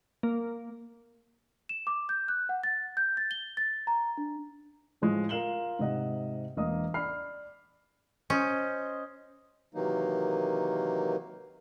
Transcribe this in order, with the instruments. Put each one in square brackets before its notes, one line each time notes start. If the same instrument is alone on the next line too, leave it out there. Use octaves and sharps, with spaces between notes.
[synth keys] A#3
[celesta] E7
D6
G6
F#6
F#5
A6
G6
A6
G7
A6
A#5
D4
[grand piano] A2 F3 G#3
F4 A#4 F5 E7 F#7 G7
G#2 C3 D#5 F#5
E1 A#3 D#5 D#6
D5 B5 F6 C7
[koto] C#4 [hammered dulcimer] C5 D#5
[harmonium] C3 D#3 E3 F#3 A#3 D#4